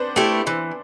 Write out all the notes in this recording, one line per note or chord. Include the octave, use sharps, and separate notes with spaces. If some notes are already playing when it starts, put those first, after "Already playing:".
Already playing: B3 C4 D4 B4 C5 D5
A3 E4 G4
E3